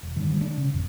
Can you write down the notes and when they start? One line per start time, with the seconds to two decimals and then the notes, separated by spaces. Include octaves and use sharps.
0.03 E1
0.16 G2 D#3
0.28 D#3 F#3 G3
0.41 D#3 G#3 D4
0.58 C#3
0.74 G#1 F2